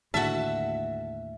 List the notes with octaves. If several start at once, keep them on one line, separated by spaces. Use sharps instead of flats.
D#2 A2 D3 F#4 E5 A5